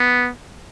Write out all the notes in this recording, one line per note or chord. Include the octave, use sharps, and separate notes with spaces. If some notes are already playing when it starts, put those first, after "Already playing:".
Already playing: B3